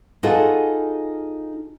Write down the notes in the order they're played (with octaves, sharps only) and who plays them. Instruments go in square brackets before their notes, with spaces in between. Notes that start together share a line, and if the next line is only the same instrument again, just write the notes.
[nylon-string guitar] D#4 F4 F#4 G#4 A4 D#5